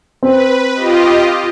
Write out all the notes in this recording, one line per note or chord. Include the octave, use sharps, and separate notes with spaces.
C4 B4
F4 G4 D#5